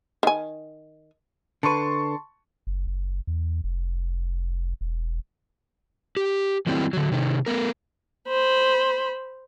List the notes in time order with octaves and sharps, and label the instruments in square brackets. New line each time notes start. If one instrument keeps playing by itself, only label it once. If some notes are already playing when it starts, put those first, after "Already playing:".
[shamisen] D#3 G#5
[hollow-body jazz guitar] D3 B4 [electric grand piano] A5 C6 C#6
[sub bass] F#1
F#1
E2
F1
E1
[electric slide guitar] G4
D#3 F#3 G3 C4 D#4 E4
D3 F#3
C3 D#3
A3 B3 A#4
[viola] C5 B5